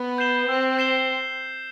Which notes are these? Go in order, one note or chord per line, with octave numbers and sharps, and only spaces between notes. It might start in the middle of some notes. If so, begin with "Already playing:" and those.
Already playing: B3
G6 C7 E7 G7
C4 E6
G6 C7 E7 G7